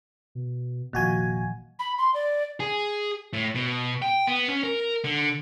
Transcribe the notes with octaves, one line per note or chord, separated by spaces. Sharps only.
B2
F1 A#2 D#3 F3 F#4 G#5
B5
C6
D5
G#4
A2
B2
G5
B3
C#4
A#4
D3